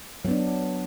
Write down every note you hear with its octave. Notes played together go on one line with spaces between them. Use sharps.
F#3 B3 D4